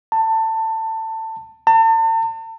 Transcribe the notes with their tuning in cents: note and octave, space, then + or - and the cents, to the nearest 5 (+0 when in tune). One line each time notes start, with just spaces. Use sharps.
A5 +20
A5 +40